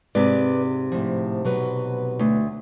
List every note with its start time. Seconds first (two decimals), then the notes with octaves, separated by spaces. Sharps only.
0.15 G#2 C3 B4 D5
0.92 A2 F3
1.45 B2 F#3 B4
2.19 D2